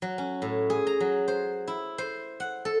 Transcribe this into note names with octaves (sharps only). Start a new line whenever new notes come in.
F#3
C#4
A2
G#4
A#5
F#3
C5
E4
C5
F#5
A4